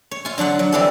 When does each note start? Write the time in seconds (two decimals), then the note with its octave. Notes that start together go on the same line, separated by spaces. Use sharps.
0.11 C#5
0.25 F4 G#5
0.38 D3 F#3 D4 F#5
0.59 F#3
0.72 E3 G3 C4 D4 A4